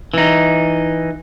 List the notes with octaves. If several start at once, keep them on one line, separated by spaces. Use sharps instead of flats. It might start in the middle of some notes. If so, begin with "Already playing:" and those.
E3 D#4